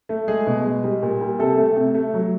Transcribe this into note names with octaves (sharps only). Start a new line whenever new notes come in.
A3
G#3 G#4
B2
G#3
G3
A#2
G3
C3 A4
A3
C3
A3
F#3